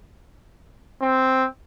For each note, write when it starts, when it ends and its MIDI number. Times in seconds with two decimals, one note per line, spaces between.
1.02 1.46 60